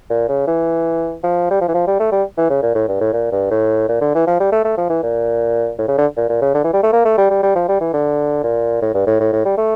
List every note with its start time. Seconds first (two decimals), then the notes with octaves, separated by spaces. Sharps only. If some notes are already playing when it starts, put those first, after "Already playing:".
0.10 A#2
0.29 C#3
0.47 E3
1.24 F3
1.51 G3
1.61 F3
1.68 E3
1.74 F3
1.87 G3
2.00 A3
2.12 G3
2.38 E3
2.50 C#3
2.62 A#2
2.75 A2
2.88 G2
3.01 A2
3.13 A#2
3.32 G2
3.51 A2
3.89 A#2
4.01 D3
4.15 E3
4.27 F3
4.40 G3
4.52 A3
4.65 A3
4.78 F3
4.90 E3
5.03 A#2
5.79 A2
5.88 C#3
5.98 D3
6.17 A#2
6.29 A#2
6.42 C#3
6.54 D3
6.64 E3
6.73 G3
6.83 A3
6.93 A#3
7.05 A3
7.18 G3
7.30 G3
7.43 G3
7.55 F3
7.68 G3
7.81 E3
7.94 D3
8.43 A#2
8.82 A2
8.94 G2
9.07 A2
9.20 A2
9.33 A2
9.45 G3
9.58 A3